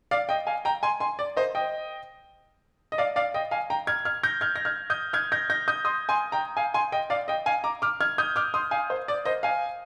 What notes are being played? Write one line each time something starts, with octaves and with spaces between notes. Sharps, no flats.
D5 F5
D#5 G5
F5 G#5
G5 A#5
G#5 C6
G#5 C6
D5
C5 D#5
D#5 G5
D#5
D5 F5
D5 F5
D#5 G5
F5 G#5
G5 A#5
F6 G#6
F6 G#6
G6 A#6
F6 G#6
A#6
F6 G#6
D#6 G6
F6 G#6
G6 A#6
G6 A#6
D#6 G6
C6 D#6
G#5 C6
G5 A#5
F5 G#5
G#5 C6
D#5 G5
D5 F5
D#5 G5
F5 G#5
A#5 D6
D6 F6
F6 G#6
D#6 G6
D6 F6
C6 D#6
F5 G#5
C5
D5
C5 D#5
F5 G#5